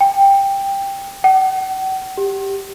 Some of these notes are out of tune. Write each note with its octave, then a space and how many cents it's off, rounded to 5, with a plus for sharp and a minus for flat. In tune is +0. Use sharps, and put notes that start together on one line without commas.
G5 +10
F#5 +45
G4 +5